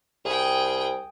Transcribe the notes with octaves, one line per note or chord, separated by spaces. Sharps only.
C2 G#4 G5